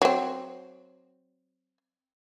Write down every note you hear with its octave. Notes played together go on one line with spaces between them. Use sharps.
F#3 C4